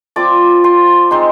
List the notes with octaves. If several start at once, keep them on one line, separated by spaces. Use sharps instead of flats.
F3 C4 F4 D5 D6
C5 C6
G#3 C4 D#4 C5 C6